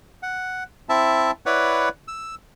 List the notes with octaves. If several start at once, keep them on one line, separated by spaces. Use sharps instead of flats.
F#5
C4 E4 E5 A5
E4 B4 C#5 D5 F#5
E6